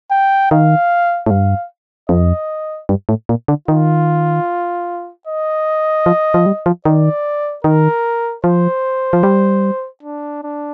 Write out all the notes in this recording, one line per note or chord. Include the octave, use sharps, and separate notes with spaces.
G5
D#3 F5
A2
G2 F5
F2 D#5
G2
A2
A#2
D3
D#3 F4
D#5
F3
F3
G3
F3
D#3 D5
D#3 A#4
F3 C5
F3
G3
D4
D4